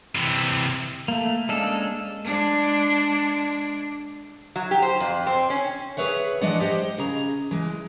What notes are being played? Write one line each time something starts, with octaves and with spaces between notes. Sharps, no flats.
C3 E3
A3 A#3
G#3 A#3 C#4 D4 A4
G#3 D4
F#3
G4
C5
F2
C4
C#4
G#4 B4 C#5 E5 F#5
E3 F3 G#3 D4 D#5 F#5
G4 C5 D#5
C#3 G#4 A#5
E3 G#3